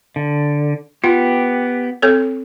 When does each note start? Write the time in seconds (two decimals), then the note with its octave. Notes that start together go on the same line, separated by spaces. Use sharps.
0.16 D3
1.04 B3 F4 G4
2.02 C4 A4 C#5